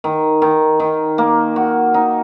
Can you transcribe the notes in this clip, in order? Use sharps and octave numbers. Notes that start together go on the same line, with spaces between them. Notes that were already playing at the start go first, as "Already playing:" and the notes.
D#3
D#3
D#3
A#3
F#4
D#4